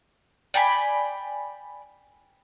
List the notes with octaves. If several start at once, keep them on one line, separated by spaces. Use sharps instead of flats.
D5 G5 G#5 B5